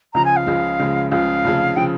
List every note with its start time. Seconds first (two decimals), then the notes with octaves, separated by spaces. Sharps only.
0.14 C#2 C#3 F3 G#3 A#5
0.25 G#5
0.36 F5
0.46 C#2 C#3 F3 G#3
0.79 C#2 C#3 F3 G#3
1.11 C#2 C#3 F3 G#3 F5
1.44 F1 F2 C#3 F3
1.76 C#3 F3 G5